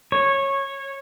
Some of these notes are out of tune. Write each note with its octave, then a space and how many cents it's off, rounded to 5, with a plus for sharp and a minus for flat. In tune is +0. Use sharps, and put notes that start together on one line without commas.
C#5 -15